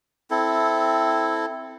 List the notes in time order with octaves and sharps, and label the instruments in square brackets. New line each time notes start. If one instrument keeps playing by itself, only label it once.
[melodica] C4 E4 A4